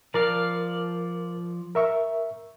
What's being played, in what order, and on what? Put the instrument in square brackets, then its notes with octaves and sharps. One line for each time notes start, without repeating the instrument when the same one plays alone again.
[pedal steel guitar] F3 D5 F5 [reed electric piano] A#4
[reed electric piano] A#4 E5 C#6